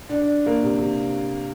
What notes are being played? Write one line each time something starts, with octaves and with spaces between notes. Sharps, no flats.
D4
D4
A#3
C3
C3